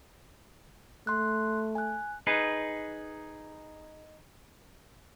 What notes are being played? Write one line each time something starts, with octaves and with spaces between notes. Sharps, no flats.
A3 C6 F#6
G#5 F#6
D#4 G#4 B4